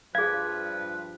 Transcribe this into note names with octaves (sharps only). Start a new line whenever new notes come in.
G2 F3 G#4 B4 F5 G#6